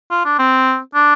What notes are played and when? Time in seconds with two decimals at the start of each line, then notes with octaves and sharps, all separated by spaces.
0.11 F4
0.25 D4
0.39 C4
0.95 D4